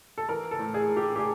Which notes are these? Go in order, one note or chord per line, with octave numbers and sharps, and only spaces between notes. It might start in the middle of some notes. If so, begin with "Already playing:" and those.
A4
E3 A#4
A4
A2
G#4
A2
G4
G4
G#4